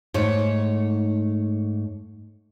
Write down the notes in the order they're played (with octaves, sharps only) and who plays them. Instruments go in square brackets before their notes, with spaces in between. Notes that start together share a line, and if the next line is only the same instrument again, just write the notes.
[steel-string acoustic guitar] G#2 A3 C#5